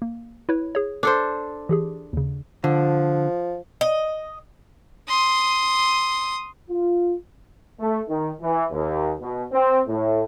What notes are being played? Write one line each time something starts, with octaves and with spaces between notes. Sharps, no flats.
A#3
E4 B4 C#5
G#4 C#5
D4 A4 C5
E3 G4 G#4
D#2 C#3
D3 F3
D#5
C6 D#6
F4
A3
D#3
E3
D#2
B2
C4
A2